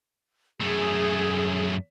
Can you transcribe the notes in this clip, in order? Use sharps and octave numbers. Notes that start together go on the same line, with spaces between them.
F#2 A3 G#4